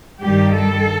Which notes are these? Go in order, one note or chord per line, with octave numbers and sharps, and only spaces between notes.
G2 D#3 G3 G4
A4